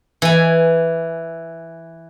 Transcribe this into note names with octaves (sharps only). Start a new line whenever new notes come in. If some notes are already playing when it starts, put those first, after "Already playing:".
E3 G#5